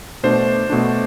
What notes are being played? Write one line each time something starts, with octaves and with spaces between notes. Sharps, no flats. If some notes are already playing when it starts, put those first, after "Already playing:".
B2 A3 D4 C5
B2 A3 D4